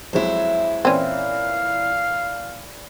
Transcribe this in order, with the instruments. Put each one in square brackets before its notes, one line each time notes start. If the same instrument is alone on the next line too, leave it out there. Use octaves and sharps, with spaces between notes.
[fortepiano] F2 F#3 G#3 [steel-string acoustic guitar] E4 C5
[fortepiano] A#2 E3 [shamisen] C4 C#4 [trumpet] F5